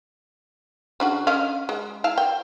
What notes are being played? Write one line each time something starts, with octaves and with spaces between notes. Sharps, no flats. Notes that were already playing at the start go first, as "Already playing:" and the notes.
C#3 D4 F#4
C#4 D#5 F5
G#3
E4 F5 A5
G5